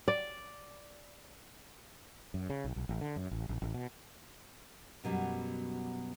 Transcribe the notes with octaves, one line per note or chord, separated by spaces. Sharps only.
D5
F#2
C#3
B1
B1
A1
D3
F#2
A1
A#1
A1
B2
F#2 B2 F#3 G3